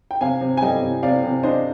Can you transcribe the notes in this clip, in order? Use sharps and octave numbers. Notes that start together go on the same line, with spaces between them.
G5
C3 F5 G#5
C3
G#5
G3 D#5 G5
C3
C3 D5 F5
C3
D4 C5 D#5